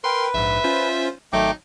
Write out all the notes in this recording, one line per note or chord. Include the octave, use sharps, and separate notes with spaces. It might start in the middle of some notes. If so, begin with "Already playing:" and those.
A#4 B4 G5 C6
A#1 G#2 E5
C#4 F4 C5
G#1 F#3 A3 D#4 G5 D6